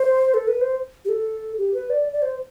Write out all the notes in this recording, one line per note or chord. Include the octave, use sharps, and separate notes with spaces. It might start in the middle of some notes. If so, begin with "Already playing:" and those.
Already playing: C5
A4
B4
C5
G4
A4
G4
B4
D5
D5
C5